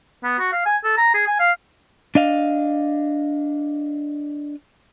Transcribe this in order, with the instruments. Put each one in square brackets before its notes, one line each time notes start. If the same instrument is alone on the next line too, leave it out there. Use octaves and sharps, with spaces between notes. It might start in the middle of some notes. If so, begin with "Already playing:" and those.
[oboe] B3
F#4
F5
G#5
A4
A#5
G#4
G#5
F5
[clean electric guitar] D4 D#5 F5